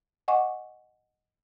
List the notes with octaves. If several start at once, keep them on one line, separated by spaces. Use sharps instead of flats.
D#5 F#5 G#5 C#6 D6